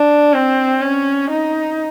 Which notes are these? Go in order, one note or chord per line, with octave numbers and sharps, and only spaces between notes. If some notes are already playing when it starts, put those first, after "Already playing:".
Already playing: D4
C4
C#4
D#4